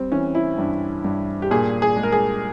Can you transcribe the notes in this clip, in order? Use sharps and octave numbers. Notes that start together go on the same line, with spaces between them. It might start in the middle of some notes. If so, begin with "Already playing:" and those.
Already playing: G3 C4
E3 C#4
E4
G2
G2
G4
A#2 G#4
G#4
G#3
A#4
G#4